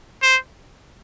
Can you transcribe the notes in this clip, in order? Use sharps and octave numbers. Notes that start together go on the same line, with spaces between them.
C5